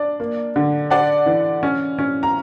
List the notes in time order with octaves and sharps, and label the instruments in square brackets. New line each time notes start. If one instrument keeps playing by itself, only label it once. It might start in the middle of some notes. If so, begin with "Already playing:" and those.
Already playing: [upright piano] D4 D5
A#3
D3
D4 D5 F#5
E3
C#4
C#4
A#5